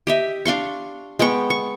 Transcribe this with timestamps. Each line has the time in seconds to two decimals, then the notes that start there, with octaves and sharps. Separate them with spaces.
0.07 G4 D#5 E5
0.45 D4 F5 C6 C#6
1.19 G#3 B3 G5 C#6
1.50 C#6